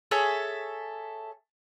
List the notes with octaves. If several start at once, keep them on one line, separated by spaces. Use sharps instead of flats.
G#4 A4 C#5 E5